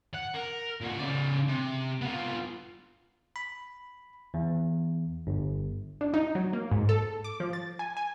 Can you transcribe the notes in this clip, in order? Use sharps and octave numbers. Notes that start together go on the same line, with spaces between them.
F#5
A#4
A#2 F#4
C#3 D5
C3
B3 F4
B5
E2
G1
D4
D#4
F#3
A#3
G#2
A4
D6
F3
A6
G#5
G#5